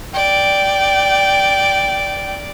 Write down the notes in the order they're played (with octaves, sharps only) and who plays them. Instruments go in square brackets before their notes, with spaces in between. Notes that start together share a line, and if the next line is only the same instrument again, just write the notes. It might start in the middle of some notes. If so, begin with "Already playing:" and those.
[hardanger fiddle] D5 [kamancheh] G5